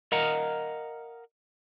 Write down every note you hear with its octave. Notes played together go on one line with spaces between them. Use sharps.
A#4 D#5 F5 F#5 A#5